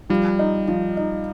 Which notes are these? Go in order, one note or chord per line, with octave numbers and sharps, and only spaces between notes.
F3 G3
D#4
F3
D#4